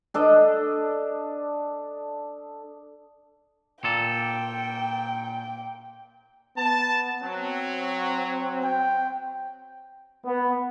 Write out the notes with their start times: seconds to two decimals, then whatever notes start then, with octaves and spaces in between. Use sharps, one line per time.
0.14 D4 A4 D#5
3.84 A#2 A4 G5
6.57 B3 A5
7.23 F#3 C4
8.64 G5
10.25 B3